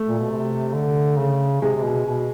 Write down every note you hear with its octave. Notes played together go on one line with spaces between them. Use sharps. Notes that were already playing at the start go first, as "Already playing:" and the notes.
Already playing: A3
A#2
B2
C3
D3
C#3
C3 G#3
C3
B2
B2